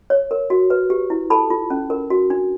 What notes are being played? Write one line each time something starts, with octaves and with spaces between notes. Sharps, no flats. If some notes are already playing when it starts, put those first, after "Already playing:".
C#5
A#4
F#4
B4
G4
E4
A4 A5 B5
F4
C#4
A#4
F#4
D4